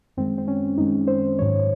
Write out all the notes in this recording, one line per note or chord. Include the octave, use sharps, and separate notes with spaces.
F#2 D#3 G#3 C4
C4
C#4
F#2 D#3 G#3 D#4
C5
G#2 D#3 F#3 C#5